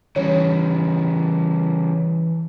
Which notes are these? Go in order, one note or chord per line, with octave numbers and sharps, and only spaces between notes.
C#3 E3 G3 C#5